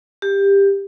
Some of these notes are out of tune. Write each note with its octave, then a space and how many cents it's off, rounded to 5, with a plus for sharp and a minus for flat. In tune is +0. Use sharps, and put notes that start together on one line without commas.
G4 +15